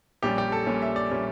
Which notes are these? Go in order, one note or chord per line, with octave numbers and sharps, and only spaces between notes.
A#1 A#2 G3 C#4 G4
G4
A4
A#1 A#2 G3 C#4
E5
D5
A#2 G3 C#4